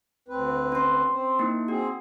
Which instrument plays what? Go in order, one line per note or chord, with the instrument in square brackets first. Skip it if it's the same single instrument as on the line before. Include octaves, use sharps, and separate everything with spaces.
[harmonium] D2 C4 B4
[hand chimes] C#4 C6
[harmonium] C4 C5
[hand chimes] A#3 D#4 E4
[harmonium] C4 G#4 [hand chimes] F#4